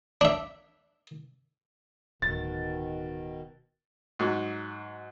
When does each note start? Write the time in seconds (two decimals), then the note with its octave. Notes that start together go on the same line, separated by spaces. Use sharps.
0.21 D4 E5
2.22 D1 B2 D#3 A6
4.19 G#2 F#3